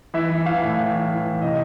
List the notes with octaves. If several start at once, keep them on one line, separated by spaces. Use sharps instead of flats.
E3 E5
E3
E3 F5
A2
E3
E3
E3
E3
C3 D#5